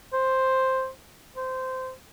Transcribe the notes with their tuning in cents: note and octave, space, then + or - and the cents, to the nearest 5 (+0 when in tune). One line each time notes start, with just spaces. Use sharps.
C5 +5
C5 -15